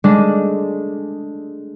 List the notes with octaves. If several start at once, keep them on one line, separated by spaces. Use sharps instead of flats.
G#3 A3 D4